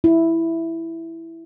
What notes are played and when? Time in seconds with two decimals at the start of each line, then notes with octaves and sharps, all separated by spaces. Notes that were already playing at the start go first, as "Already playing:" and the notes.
0.04 E4